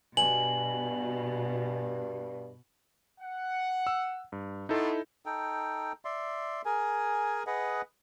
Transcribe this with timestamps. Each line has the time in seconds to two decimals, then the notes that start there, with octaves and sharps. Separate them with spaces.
0.17 G2 B2 G#5 F#7
3.20 F#5
3.87 E6
4.32 G2
4.69 A3 B3 D#4 E4 A4 C6
5.26 D#4 A4 G5
6.05 D5 E5 C6
6.65 G#4 A#4 G#5
7.47 G#4 B4 D#5 F#5